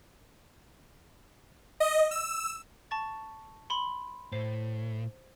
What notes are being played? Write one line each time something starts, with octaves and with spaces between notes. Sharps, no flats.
D#5
E6
A5 C#6 A6
B5 C6
A2 C5 C7